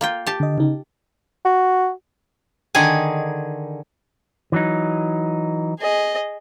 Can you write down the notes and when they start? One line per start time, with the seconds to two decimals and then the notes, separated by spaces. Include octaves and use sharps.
0.01 A#3 F4 G5
0.26 G4 A5
0.40 D3 D#5
0.58 C#3 D#4
1.45 F#4
2.75 D3 D#3 G#4 G#5
4.52 E3 F#3 D#4
5.80 G#4 D#5